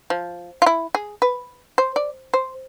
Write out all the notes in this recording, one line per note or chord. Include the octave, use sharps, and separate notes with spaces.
F3
F4
E4
G#4
B4
C5
D5
C5